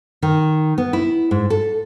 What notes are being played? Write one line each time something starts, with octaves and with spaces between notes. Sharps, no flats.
D#3
B3
E4
G#2
A4